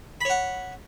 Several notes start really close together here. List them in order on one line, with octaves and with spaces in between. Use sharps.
B5 C#5 F#5